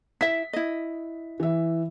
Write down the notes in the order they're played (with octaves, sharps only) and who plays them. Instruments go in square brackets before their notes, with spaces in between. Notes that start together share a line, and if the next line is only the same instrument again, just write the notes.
[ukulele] E4 E5 [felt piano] B6
[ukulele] E4 D#5
[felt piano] E3 E5